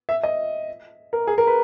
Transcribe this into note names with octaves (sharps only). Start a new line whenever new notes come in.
E5
D#5
A#4
G#4
A#4
B4